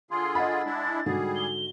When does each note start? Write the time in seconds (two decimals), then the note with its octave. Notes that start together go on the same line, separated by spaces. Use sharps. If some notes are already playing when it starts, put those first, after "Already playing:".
0.11 D3 F4 G#4 C6
0.35 D#5 F#5 B5 A6
0.66 G#3 D4 E4
1.06 G#2 D3 G3 F#4 G#4
1.36 G7